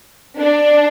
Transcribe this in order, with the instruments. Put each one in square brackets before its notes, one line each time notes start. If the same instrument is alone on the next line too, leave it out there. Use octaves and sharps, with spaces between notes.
[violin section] D4